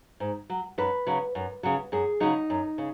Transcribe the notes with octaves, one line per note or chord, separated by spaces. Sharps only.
G#2
F#3
F#2 B4
C#3 F#3
F#2
C#3 F#3
F#2 G#4
C#3 F#3 D#4
F#2
C#3